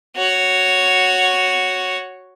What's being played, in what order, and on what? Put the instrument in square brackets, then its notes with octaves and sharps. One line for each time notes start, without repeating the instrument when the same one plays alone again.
[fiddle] F#4 C#5